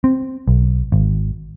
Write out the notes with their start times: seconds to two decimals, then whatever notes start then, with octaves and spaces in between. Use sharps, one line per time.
0.04 C4
0.48 B1
0.92 G#1